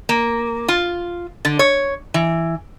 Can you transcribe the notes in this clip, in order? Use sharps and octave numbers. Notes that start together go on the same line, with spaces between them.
A#3
F4
D3
C#5
E3